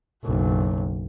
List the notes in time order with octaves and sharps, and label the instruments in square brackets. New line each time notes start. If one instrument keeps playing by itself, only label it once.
[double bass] F#1 B1